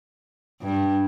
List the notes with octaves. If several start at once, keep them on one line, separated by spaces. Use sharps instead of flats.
G2